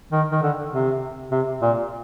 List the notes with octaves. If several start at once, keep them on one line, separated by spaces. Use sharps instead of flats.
D#3
D#3
D3
C3
C3
A#2